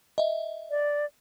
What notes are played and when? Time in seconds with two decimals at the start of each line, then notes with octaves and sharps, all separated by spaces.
0.18 D#5 E5
0.70 D5